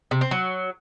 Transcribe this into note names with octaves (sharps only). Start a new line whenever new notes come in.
C3
C4
F#3